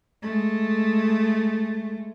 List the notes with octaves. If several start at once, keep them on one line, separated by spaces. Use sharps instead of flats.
G#3 A3